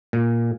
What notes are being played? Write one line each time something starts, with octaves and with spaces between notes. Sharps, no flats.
A#2